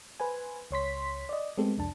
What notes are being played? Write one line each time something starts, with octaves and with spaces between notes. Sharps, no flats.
B4 C5 G#5
C#2 C#5 C6 B6
D5 D#5
G#3 A3 B3 C4 G4 A4
C2 F2 D4 A5